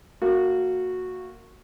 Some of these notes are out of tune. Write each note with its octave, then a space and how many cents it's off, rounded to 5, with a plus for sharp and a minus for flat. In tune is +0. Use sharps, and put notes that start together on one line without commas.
A#3 -25 F#4 -10